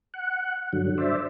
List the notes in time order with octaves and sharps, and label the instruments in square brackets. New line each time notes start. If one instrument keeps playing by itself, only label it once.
[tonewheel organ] F#5
G2 D3 F#3
C5 D5 E5